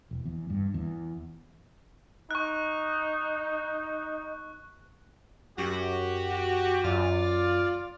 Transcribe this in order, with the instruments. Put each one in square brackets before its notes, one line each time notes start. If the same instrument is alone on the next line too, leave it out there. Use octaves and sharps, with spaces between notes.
[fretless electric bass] E1
E2
G2
E2
[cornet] D#4 [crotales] C#6 F#6
[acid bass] F#2 [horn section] F#4 G4
[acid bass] F#2 [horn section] F4 D5